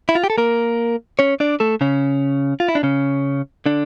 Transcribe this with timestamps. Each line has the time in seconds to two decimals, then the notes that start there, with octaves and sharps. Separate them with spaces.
0.09 E4
0.15 F4
0.24 G4
0.30 A4
0.38 A#3 A#4
1.19 C#4 C#5
1.40 D4 D5
1.60 A3 A4
1.81 C#3 C#4
2.60 F4
2.68 E4
2.75 D4
2.83 C#3 C#4
3.66 D3 D4